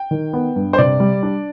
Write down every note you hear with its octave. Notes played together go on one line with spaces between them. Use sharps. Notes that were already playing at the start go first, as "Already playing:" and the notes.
Already playing: G5
D#3
B3
G2
C5
C3 D5
G3
D4